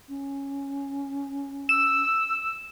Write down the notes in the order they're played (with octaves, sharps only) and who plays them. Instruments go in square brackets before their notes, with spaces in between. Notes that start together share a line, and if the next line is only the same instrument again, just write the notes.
[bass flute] C#4
[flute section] E6 [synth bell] E7